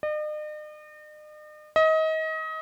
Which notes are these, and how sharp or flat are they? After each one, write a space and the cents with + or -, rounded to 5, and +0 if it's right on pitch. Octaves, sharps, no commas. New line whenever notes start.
D#5 -45
D#5 +30